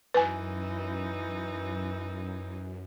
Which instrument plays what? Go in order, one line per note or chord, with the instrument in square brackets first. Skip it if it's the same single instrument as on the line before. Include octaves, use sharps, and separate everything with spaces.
[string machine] F#2 [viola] E3 D#4 [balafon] B4 G#5